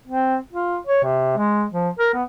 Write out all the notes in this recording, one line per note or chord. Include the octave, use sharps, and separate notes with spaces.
C4
F4
C#5
C3
G#3
F3
A#4
B3